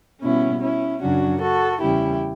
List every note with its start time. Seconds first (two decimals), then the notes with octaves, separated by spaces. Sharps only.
0.22 B2 G3 B3 C#4 E4
0.62 C#4 E4
1.01 F#2 C#3 F#3 C#4 D4 F#4
1.40 F#4 A4
1.80 E2 C#3 G3 C#4 E4 G4